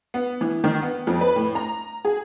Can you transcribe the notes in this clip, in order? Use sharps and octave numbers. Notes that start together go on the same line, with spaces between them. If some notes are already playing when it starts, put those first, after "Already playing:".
B3
E3
D#3
B3
F2
B4
A2
A#5
G#4